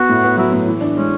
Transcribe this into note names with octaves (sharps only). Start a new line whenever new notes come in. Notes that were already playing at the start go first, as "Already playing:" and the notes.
Already playing: B3 F#4
A2
B3
F#3 E4
A2
E3
D4
G#3 C#4